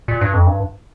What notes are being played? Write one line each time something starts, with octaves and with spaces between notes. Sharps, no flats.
A#2
G2
F2
G2